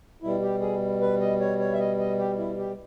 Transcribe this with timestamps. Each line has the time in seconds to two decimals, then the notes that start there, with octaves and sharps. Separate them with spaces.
0.22 B2 G3 E4
0.42 G4
0.61 G#4
1.01 B4
1.20 D#5
1.40 C#5
1.59 C#5
1.73 E5
1.79 D#5
1.99 D#5
2.18 G4
2.38 E4
2.58 G4